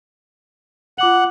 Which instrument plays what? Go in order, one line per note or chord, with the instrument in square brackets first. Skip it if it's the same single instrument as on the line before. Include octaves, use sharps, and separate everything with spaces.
[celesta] F4 D6 F#7 [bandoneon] F#5